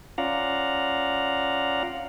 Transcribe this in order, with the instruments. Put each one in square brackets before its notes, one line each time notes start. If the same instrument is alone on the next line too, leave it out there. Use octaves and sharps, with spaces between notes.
[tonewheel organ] C#4 F4 D5 F5 F#5 A#5